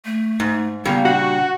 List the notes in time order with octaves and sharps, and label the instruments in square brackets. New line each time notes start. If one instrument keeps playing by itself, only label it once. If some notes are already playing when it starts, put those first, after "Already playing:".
[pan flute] A3
[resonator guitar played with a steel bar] G#2
[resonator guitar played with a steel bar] A#2 C#3 G3 [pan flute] B3
[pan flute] D4 [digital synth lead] F#4